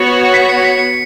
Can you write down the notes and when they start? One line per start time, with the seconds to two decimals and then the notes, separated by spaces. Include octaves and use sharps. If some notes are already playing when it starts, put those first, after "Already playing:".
Already playing: B3 F#4 C#5
0.34 B6
0.49 C#7
0.65 B6
0.79 C#7